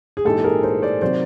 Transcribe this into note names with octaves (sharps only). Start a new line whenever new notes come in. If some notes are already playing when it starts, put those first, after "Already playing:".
G#4
A#1 G#2 E3 G4 A4
G#4 A#4
A#4 C5
C5 D5
C3 D#3 F#3 C5 D5